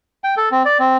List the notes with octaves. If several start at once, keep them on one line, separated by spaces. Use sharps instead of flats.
G5
A4
C4
D5
C4